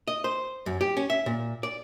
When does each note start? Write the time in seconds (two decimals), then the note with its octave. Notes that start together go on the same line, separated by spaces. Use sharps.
0.08 D#5
0.24 C5
0.66 F#2
0.81 G4
0.97 C#4
1.10 E5
1.26 A#2
1.63 D5